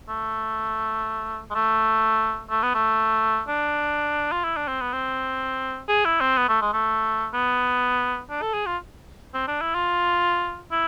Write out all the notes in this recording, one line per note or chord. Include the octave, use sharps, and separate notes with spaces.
A3
G#3
A3
A3
B3
A3
D4
F4
E4
D4
C4
B3
C4
G#4
E4
C4
B3
A3
G#3
A3
B3
D4
A4
G#4
F4
C4
D4
E4
F4
E4